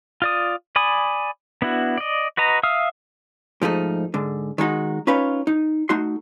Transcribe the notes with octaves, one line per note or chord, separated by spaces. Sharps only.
F4 D5 D#6
D5 G#5 B5 D#6
B3 D4 E4 F#4
D5 D#5
F#4 B4 D#5 A#5
E5 F5 D#6 F6
G#2 F3 A3 D#4
G#2 D3
D#3 G#3 D#4 F#4
C#4 D#4 F4 B4 C#5
D#4
A3 D#4 F#4 C6